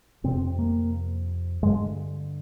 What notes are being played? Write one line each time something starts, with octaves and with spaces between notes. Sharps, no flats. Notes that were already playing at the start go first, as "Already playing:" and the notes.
F2 C3 C4
A#3
G2 D3 G#3